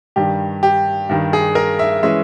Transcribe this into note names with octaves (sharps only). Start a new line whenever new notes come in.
G2 D#3 G3 G4
G4
G2 D#3 G3
G#4
A#4
E5
E3 G#3 C#4 E5